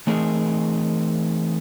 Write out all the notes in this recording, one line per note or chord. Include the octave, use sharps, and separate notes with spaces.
E3 A3 C4 D#4 G#4 A#4